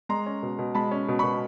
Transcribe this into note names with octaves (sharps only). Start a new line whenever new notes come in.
G#3 A#5 C6
C#4
B2
B2
G#3 A5 B5
C#4
B2
B2 B5 C#6